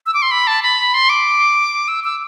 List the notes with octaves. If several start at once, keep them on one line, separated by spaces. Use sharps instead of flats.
E6
D6
C6
B5
A5
B5
C6
D6
E6
E6